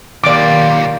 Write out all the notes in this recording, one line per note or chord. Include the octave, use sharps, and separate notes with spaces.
B1 A#2 D#3 A#3 G4 D5 D6